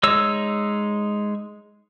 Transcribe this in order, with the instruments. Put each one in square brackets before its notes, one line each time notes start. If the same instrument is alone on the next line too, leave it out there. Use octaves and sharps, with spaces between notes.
[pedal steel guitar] G#3 D#4 C#5 E6